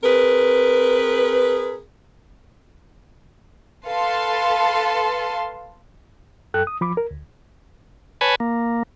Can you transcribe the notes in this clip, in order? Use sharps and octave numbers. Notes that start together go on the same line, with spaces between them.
C4 G#4 A#4 B4
A4 B4 F5 A5 C6
F#2 A4 G5 F#6
D#6
F3 B5 D6
A#4
D2
B4 C#5 G#5 A5 B5
A#3